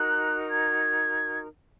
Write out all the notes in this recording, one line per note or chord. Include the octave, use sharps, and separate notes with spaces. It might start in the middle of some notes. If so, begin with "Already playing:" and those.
Already playing: D#4 F#4 A#4 F#6
G#6